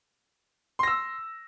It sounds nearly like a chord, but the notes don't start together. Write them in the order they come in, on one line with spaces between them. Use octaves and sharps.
C6 A#6 E6